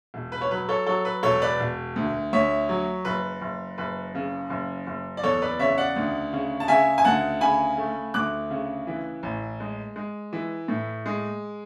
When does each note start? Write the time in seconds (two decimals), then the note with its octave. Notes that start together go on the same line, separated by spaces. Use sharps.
0.14 E1
0.32 B4
0.41 C#5
0.51 F#3 B4
0.69 A4 C#5
0.86 F#3 A4 C#5
1.05 B4
1.23 E1 A4 C#5
1.42 B4 D5
1.60 E1
1.96 D2
2.33 D2 C#5 E5
2.69 F#3
3.05 F#1 B4
3.42 F#1
3.78 F#1 B4
4.15 C#3
4.50 F#1
4.87 F#1
5.17 D5
5.23 E2 A4 C#5
5.42 B4 D5
5.59 C#3 C#5 E5
5.78 D5 F#5
5.96 D2
6.33 C#3
6.60 A5
6.68 C#3 E5 G#5
6.98 G#5
7.05 D2 F#5 A5
7.41 C#3 G#5 B5
7.78 A3
8.14 D2 D6 F#6
8.50 C#3
8.87 E3
9.23 A1
9.60 G#3
9.96 G#3
10.33 E3
10.68 A2
11.06 G#3